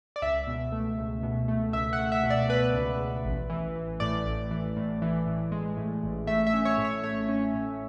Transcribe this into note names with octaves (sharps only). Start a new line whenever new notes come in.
D5
C#2 E5
B2
A3
C#2
B2
A3
C#2 E5
F#5
A3
E5
B2
D5
B2 B4
C#2
C#2
A1
E3
E3
A2 D5
A1
E3
A2
E3
A2
G#3
A2
A1
A3 E5
E5
C#4
C#5
A2
C#5
A3 C#5
C#4
A2